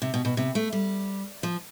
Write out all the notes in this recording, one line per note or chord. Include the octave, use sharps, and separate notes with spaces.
C3
B2
B2
C3
A3
G3
F3